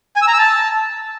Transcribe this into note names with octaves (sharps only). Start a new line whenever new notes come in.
G#5
E6
A#5
E6
A5